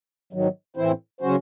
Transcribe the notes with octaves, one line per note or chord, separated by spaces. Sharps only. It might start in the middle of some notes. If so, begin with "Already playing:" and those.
G#2 D#3 F#3
A2 E3 C4 E4 C5
C#3 F#3 C#4 F#4 C5